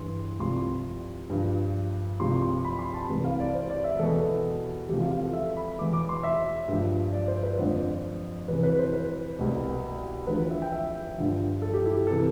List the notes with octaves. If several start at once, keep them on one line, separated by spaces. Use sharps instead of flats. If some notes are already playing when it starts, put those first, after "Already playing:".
Already playing: G2 E3 C6
C2 C3 F3 C6
G2 F3
C2 C3 F3 C6
C6
B5
C6
A5
C2 C3 E3
F5
D5
C5
D5
E5
E2 B2 A4
E2 C3 F3 G4
F4
F4
A4
E5
B5
E2 B2 D6
D6
C6
E5
G2 F3
D5
C5
B4
F2 D3 F3 C5
E2 C3 E3 B4
B4
C5
B4
C2 B2
E2 D3 F3 B4
E5
G5
E5
G2 D3 F3
A4
G4
E4
G4
C3 E3 A4